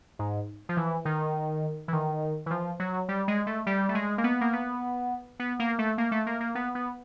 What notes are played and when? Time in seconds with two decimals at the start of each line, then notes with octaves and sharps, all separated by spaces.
0.19 G#2
0.69 F3
0.77 E3
1.05 D#3
1.88 E3
1.93 D#3
2.46 E3
2.50 F3
2.80 F#3
3.08 G3
3.28 G#3
3.47 A3
3.66 G3
3.89 A3
3.95 G#3
4.18 A#3
4.24 B3
4.41 A#3
4.53 B3
5.39 B3
5.59 A#3
5.79 A3
5.98 A#3
6.12 A3
6.26 A#3
6.40 A#3
6.55 B3
6.75 B3